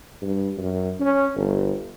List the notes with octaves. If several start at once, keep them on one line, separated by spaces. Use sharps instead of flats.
G2
F#2
C#4
G1